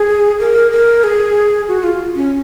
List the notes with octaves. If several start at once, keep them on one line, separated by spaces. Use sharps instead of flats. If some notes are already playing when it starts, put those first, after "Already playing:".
Already playing: G#4
A#4
A#4
G#4
F#4
F4
C#4